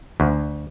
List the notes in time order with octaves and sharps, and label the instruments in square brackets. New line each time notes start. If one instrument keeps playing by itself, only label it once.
[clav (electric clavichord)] D2